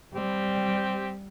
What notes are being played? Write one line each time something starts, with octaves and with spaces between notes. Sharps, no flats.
G3 C4 G4